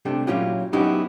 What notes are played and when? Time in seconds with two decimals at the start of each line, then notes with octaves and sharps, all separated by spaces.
0.05 C3 G3 A3 D4
0.27 A#2 F#3 C#4 E4 F4 G4
0.73 F#3 B3 C#4 D#4 E4 G4